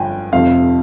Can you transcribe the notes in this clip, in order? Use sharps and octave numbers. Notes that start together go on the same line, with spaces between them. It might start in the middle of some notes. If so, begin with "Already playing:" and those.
Already playing: G1 G2 F3 G5 G#5
F1 F2 C3 F3 F5